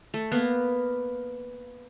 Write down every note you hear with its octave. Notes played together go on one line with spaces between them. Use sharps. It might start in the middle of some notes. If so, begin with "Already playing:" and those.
A3
A#3 B3